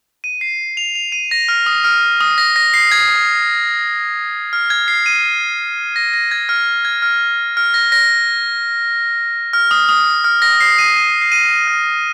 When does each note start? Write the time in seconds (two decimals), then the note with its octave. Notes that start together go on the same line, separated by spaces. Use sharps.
0.24 D#7
0.41 C7
0.77 F7
0.95 F7
1.12 D#7
1.31 A#6
1.48 F6
1.66 D#6
1.84 F6
2.21 D#6
2.38 A#6
2.56 A#6
2.74 C7
2.92 G#6
4.53 F6
4.70 G#6
4.88 C7
5.06 D#7
5.96 A#6
6.14 A#6
6.31 G#6
6.49 F6
6.85 G#6
7.02 F6
7.57 F6
7.74 A#6
7.92 A#6
9.53 F6
9.71 D#6
9.89 D#6
10.24 F6
10.42 A#6
10.61 C7
10.78 D#7
10.96 D#7
11.21 C7
11.32 D#7
11.68 F6